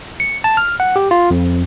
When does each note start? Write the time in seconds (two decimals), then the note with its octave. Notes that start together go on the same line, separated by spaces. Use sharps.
0.20 C#7
0.44 A5
0.57 F6
0.80 F#5
0.96 G4
1.11 F4
1.31 F2